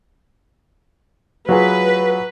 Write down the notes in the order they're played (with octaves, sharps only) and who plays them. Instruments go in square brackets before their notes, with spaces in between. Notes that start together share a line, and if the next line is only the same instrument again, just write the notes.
[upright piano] F#3 F4 G#4 [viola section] B4